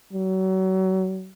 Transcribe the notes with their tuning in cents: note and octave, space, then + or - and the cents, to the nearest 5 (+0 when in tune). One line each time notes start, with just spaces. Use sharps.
F#3 +30